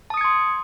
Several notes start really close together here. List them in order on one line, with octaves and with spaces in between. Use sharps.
A5 D#6 C#7 G#6 C6